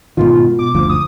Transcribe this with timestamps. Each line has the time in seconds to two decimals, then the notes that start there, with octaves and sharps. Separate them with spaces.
0.17 G#2 B2 D#3 F4
0.59 B2 D6
0.74 F#1 D2 F3
0.89 D#6